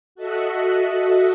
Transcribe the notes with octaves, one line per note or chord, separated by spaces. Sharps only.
F#4 A4 D#5 E5 F#5